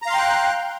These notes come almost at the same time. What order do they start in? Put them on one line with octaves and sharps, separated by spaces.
A#5 F5 C6 G5 F#6